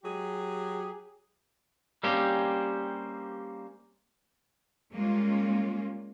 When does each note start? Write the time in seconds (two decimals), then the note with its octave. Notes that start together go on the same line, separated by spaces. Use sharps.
0.04 F#3 G4 G#4
2.03 G3 A#3 C4 C#4 G4
4.93 G3 G#3 A#3 C#4 F4